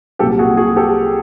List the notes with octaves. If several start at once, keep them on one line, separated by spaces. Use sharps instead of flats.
C2 A#2 F#3 G4 A4
F#4 G#4
F#4 G#4
G4 A4